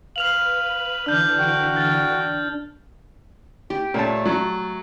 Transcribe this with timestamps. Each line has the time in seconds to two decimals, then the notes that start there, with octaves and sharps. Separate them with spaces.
0.16 B4 F5 F6 F7 F#7
1.06 D3 E3 D4 F6 G6
1.39 F#4 G5
1.76 F6 A6
3.70 G4
3.94 A#2 A3 C#5 A5
4.25 F#3